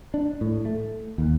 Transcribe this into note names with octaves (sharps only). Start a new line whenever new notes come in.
D4
A2
A3
D#2